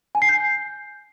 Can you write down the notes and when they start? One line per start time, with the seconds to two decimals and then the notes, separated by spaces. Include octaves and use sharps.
0.15 G#5
0.22 C7
0.29 G6